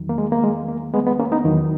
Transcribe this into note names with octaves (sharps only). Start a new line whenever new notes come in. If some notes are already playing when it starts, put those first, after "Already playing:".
Already playing: E2 D#3 F#3
A#3
G#3
A#3
G#3
A#3
G#3 B3
G#3 B3
A#3 C#4
B3 D#4
E2 D#3 F#3